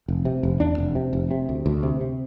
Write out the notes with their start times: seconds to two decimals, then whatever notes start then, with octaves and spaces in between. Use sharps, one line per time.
0.08 F1
0.25 C3
0.43 F1
0.60 E2 D4
0.78 F1
0.95 C3
1.13 F1
1.31 C3
1.49 D2
1.66 D2
1.83 C3
2.01 C3